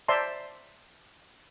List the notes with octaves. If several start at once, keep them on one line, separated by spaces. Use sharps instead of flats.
C5 D5 E5 A5 A#5 C6